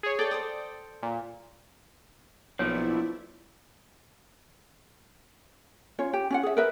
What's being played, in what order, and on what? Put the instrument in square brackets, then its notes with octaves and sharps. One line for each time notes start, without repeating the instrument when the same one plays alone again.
[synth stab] G#4 C#5
[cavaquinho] A4 A5 [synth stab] D5 G5
[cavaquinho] A4 C5 D#6
[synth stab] A#2
[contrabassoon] B1 [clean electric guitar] A#2 F3 [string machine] E4 D5 E5 [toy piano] C#5
[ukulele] C#4 F4 C#5
G4
C#4 F4 F#5
G#4 E5
A#4 B4 E5